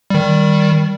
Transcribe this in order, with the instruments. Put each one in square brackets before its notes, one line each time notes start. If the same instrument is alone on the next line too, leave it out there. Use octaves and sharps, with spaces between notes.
[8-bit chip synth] D#3 G3